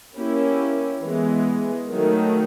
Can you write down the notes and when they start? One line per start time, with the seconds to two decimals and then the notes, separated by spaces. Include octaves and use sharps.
0.16 A#3 C#4 E4 G4
1.03 E3 G#3 B3
1.90 D#3 F#3 A3